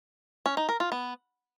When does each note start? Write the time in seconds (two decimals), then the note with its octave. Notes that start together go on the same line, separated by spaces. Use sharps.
0.46 C#4
0.57 D#4
0.69 A#4
0.80 F4
0.92 B3